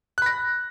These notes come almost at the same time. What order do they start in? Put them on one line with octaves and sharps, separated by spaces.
F#6 B5 A#6